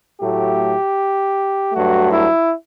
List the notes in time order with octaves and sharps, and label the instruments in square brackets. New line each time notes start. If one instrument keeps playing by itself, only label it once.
[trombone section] A2 F#3 A3 G4
G2 F#3 A3 F#4
E4